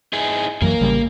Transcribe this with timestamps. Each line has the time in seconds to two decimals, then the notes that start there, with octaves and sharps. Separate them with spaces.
0.13 D#4 E4 G#4
0.62 F#2 E3 F#3 A#3 A#4
0.81 A1 C#3 G3